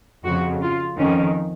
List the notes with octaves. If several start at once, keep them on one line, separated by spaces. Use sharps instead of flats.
F2 C#3 F#4
F4
F2 D#3 C#4